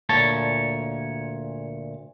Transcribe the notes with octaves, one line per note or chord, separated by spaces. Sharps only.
D2 A#2 C#5 A5